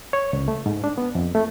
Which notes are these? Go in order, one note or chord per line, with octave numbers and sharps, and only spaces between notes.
C#5
C#2
A3
G#2
D4
B3
F2
A3